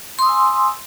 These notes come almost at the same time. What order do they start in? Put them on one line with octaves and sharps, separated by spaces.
C6 D#6 E6 G#5